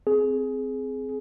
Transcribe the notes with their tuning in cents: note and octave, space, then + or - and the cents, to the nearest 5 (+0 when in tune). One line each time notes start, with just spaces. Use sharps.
C4 -10 G#4 +15